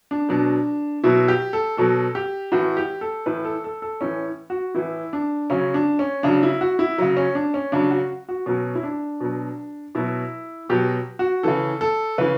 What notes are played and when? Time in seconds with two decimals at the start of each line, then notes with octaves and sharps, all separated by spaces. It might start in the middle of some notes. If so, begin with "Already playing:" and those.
0.11 D4
0.29 B2 F#3 D4
1.04 B2 F#3 E4
1.28 G4
1.53 A4
1.77 B2 F#3 A4
2.15 G4
2.52 A2 E3 F#4
2.77 G4
3.01 A4
3.26 A2 E3 B4
3.45 A4
3.64 A4
3.82 A4
4.01 A2 E3 C#4
4.50 F#4
4.75 A2 E3 E4
5.13 D4
5.50 C#3 F#3 C#4
5.74 D4
5.99 C#4
6.23 C#3 F#3 D4
6.43 E4
6.61 F#4
6.79 E4
6.98 C#3 F#3
7.17 C#4
7.35 D4
7.54 C#4
7.72 C#3 F#3 D4
7.91 F#4
8.29 F#4
8.46 B2 F#3 C#4
8.75 E4
8.83 D4
9.20 B2 F#3
9.95 B2 F#3 E4
10.70 B2 F#3 G4
11.19 F#4
11.43 C#3 E3 A4
11.81 A4
12.18 C#3 E3 B4